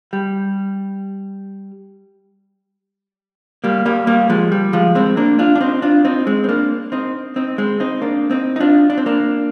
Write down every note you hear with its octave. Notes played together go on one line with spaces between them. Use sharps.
G3
G3 A#3
G3 A#3
G3 A#3
F3 G#3
G3
F3 G#3
G#3 C4
A#3 D4
D4 F4
D4
C4 D#4
D4 F4
C4 D#4
G#3 C4
C4
A#3 D4
C4 D#4
C4 D#4
G#3 C4
C4 D#4
A#3 D4
C4 D#4
D#4
D4 F4
D4
C4
A#3 D4